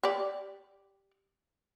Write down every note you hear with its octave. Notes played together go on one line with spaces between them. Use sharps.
G4 D5